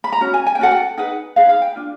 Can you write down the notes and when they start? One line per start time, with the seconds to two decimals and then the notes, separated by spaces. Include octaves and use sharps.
0.04 B5
0.12 A#5
0.21 C#4 F#4
0.34 G#5
0.46 G#5
0.55 G5
0.59 C#4 F#4 A4 F#5
0.71 G5
0.98 D#4 G#4 B4 F#5
1.36 D#4 G#4 B4 F5
1.49 F5
1.62 G5
1.76 D4 F4